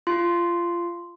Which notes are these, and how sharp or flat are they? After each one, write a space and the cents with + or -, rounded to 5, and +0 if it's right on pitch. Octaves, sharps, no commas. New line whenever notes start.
F4 -20 C6 -5